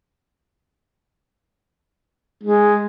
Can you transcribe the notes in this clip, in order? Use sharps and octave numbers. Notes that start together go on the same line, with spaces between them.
G#3